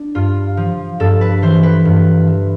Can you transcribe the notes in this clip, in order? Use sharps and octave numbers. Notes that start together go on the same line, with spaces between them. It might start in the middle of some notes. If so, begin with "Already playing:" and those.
Already playing: D4
G2 F4
F3
G2 A4
B4
E3 C5
B4
G2
E3